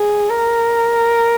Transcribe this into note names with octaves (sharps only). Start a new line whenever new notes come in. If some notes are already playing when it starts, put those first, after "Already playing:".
Already playing: G#4
A#4